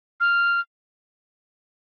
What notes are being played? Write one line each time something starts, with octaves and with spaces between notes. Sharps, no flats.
F6